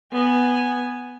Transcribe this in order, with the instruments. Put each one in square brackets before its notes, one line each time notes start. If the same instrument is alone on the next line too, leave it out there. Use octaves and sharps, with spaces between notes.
[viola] B3 G#5